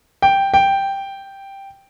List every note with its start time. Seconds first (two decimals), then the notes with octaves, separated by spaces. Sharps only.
0.22 G5
0.54 G5